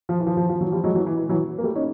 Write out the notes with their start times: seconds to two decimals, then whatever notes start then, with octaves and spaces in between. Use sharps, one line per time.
0.09 F3
0.20 E3
0.27 F3
0.37 F3
0.49 F3
0.61 E3 F#3
0.71 F3 G3
0.84 F#3 G#3
0.95 E3 F#3
1.07 E3
1.17 E3
1.29 E3 F#3
1.58 A#3
1.63 G3 A3
1.75 C#4 D#4